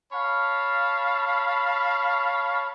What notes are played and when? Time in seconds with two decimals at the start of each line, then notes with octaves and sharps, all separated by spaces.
0.12 C#5 F5 A5 B5